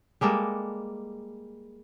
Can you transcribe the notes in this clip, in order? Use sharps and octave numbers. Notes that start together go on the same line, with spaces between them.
G3 G#3 A#3 A4